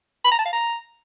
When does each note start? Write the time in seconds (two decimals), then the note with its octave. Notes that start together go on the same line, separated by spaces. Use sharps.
0.24 B5
0.32 A#5
0.39 A5
0.46 F5
0.53 A#5